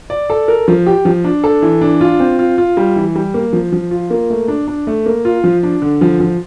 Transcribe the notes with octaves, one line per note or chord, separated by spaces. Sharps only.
D5
A4
A#4
F3
G4
F3
D4
A4
E3
D4
F4
C4
F4
F4
G3
E3
G3
A#3
F3
F3
F4
A#3
A3
D4
D4
A3
A#3
F4
F3
D4
D3
F3
F3